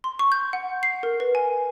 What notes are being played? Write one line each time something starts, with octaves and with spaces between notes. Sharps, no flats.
C6
C#6
G6
F#5
C7
A#4
B4
G#5